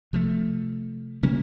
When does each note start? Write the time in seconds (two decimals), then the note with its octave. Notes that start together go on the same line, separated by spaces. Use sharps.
0.13 C3 F3 A3
1.23 C3 F#3 A#3 C#4